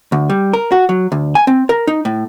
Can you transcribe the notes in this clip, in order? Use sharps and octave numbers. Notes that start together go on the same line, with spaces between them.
D2
G3
A#4
F#4
F#3
D2
G#5
C4
A#4
D#4
A2